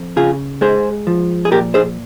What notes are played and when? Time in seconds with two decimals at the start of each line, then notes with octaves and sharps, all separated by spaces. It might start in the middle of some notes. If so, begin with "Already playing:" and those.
Already playing: F2
0.16 C#3 F4 G#4
0.61 G#3 G#4 C5
1.07 F3
1.45 G#4
1.51 A#2 G4 A#4
1.74 G#4 C5